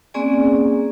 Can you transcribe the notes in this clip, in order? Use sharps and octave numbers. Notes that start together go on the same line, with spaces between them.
A#3 C4 C#4 G#4 D5 G#5